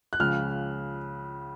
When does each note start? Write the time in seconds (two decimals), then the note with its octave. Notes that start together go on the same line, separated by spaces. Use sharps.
0.13 F#6
0.19 C#2 C#3 F3 F6